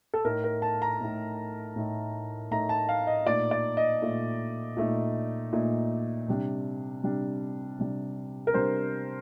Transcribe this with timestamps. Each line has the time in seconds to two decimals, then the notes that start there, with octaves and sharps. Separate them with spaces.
0.14 A4
0.24 A2 A3 D#4 A#4
0.44 A#4
0.62 A5
0.82 A#5
1.00 A2 A3 D#4
1.76 A2 A3 D#4
2.51 A2 A3 D#4 A#5
2.69 A5
2.89 F5
3.07 D#5
3.26 A#2 A3 D#4 D5
3.51 D5
3.77 D#5
4.02 A#2 A3 D#4
4.77 A#2 A3 D#4
5.53 A#2 A3 D#4
6.28 C3 G3 D4
7.03 C3 G3 D4
7.79 C3 G3 D4
8.47 A#4
8.54 C3 G3 D4 C5